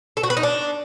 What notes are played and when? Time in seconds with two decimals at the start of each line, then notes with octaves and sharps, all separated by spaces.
0.17 A4
0.23 F#4
0.30 B4
0.37 D#4
0.43 D4